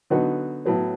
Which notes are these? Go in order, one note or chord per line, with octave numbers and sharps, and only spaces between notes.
D3 F#3 B3 D#4 F#4
A2 F#3 B3